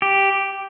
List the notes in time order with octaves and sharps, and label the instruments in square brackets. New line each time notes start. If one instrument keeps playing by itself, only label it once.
[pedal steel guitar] G4